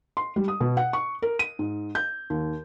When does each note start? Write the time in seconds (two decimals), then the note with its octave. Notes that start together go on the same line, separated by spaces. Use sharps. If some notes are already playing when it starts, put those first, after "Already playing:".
0.17 C6
0.36 G3
0.48 D#6
0.61 B2
0.77 F#5
0.93 C#6
1.22 A#4
1.39 D#7
1.59 G#2
1.95 G6
2.30 D#2